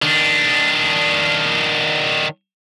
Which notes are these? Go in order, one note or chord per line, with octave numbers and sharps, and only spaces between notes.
D#3 D4